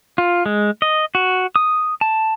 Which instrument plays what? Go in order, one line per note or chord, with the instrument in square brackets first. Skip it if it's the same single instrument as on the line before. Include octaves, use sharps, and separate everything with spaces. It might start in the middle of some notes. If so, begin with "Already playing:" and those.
[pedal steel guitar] F4
G#3
D#5
F#4
D#6
A5